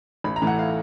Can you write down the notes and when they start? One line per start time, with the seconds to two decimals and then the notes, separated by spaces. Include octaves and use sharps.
0.24 A1 B5
0.36 A#5
0.42 A2 E3 A3
0.47 F#5
0.59 F5